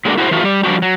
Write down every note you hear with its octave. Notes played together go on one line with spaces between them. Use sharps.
F#3 G#3 A#3 C#4 D4 F#4
E4 F#4 G#4 A#4 C5
E3 F#3 A3 F4 F#4
G3 G4
F3 G3 D4 F#4 G4
F#3